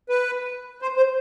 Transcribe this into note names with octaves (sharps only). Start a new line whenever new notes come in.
B4
C5
C5